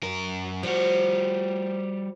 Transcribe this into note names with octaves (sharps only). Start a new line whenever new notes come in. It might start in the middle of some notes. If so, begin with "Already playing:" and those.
F#2 A#4
F3 G3 F#4